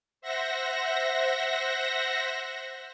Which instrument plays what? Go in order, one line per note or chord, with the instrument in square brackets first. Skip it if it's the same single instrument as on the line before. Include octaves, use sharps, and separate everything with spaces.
[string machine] C5 E5 F#5 A#6